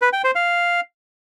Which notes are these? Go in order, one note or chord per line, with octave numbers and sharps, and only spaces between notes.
B4
G5
C5
F5